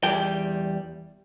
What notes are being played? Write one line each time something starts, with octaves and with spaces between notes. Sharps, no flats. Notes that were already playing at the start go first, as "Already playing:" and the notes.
E2 G3 G5